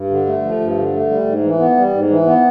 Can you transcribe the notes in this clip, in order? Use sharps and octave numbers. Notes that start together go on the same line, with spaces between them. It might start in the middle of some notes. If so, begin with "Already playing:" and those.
Already playing: G2
D3
A3
F3
G2
D3
A3
G3
G#2
E3
B3
G3
G#2
E3
B3